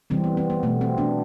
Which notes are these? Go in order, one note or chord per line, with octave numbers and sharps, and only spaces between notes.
C3 E3 G3 C4
B3
C4
B3
B2 A3 B3
C4
B3 D4